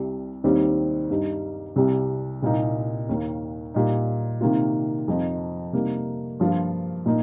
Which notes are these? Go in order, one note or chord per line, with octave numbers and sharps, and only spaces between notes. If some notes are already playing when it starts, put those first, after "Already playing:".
Already playing: C2 C3 G3
D#2 D#3 G3 C4
G2 G3 D#4
C2 C3 G3
C2 A#2 A#3 D#4
D#2 D#3 A#3
A#2 G3 D#4
C3 D#3 A#3 F4
F2 F3 D#4
C3 G3 A#3 D#4
G2 F3 A#3 F4
A#2 A#3 D#4